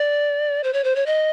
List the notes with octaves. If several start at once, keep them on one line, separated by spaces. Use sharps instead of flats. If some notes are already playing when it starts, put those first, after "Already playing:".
Already playing: D5
C5
C#5
C5
C#5
D#5